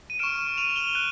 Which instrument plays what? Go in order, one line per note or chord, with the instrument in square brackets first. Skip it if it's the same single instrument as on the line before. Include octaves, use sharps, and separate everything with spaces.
[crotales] D#7
C#6 F6 D7 E7
D#7 F7
F7 G7
F#6